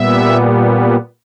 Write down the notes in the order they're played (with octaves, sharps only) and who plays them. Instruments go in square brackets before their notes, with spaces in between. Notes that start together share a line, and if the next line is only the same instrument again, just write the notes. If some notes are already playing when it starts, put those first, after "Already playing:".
Already playing: [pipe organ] A#2 G3 B3 E5